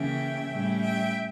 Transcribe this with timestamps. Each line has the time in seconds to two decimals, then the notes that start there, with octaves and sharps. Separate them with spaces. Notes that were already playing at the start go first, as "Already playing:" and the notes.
Already playing: C#3 E3 A#3 C#4 E5 G5
0.51 A2 G3 C#4
0.80 E5 G5